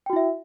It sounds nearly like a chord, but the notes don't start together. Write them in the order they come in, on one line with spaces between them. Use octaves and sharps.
G5 F#4 E4 E5